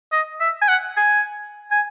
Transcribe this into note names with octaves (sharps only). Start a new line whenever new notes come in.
D#5
E5
G#5
F#5
G#5
G#5